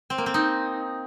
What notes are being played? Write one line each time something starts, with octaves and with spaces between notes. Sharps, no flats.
C4
A#3
C4
D#4